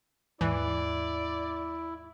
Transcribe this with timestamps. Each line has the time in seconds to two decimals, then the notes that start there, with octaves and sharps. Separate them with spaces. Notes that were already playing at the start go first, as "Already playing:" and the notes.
0.41 D#2 G#2 E3 E4 D5